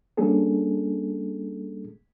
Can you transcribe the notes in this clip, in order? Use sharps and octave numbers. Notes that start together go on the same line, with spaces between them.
G3 A#3 C#4 D4 G#4 A4